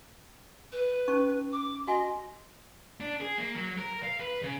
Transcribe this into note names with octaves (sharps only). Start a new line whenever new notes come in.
B4
C#4 D#4 C#6
D6
F#4 D#5 G#5
D4
G#4
A#3
F#3
A#4
F5
B4
C#3